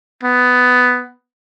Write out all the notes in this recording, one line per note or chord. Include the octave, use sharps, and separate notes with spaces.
B3